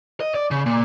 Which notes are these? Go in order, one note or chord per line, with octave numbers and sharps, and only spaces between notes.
D#5
D5
C#3
A#2